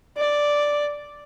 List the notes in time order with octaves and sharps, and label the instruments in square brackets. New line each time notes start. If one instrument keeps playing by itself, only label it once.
[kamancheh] D5